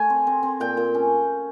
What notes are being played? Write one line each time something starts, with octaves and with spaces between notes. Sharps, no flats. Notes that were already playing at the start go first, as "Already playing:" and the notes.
Already playing: A3 G#5
C4
C4
C4
A#2 G5
A#2
C#4